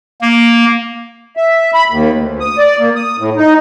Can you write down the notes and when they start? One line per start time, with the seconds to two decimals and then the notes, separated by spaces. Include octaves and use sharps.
0.22 A#3
1.37 E5
1.74 B5
1.90 D#2
2.14 D2
2.40 D#6
2.58 D5
2.79 A#3
2.96 D#6
3.19 A2
3.37 D#4